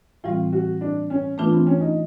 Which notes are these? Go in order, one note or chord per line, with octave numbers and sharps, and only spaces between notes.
A2 E3 G3 C4 F4
F#4
D4
C#4
E3 A3 B3 D4 F4
C4
C#4
D#4